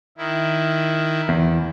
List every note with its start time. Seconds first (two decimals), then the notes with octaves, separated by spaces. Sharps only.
0.18 D#3 E4
1.29 E2